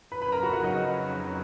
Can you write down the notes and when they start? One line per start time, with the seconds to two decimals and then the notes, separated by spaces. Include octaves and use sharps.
0.12 F2 C#3 F#3 B4 B5
0.22 B4 B5
0.32 A#4 A#5
0.43 F#4 F#5
0.53 F#4 F#5
0.63 D#4 D#5
0.74 D#4 D#5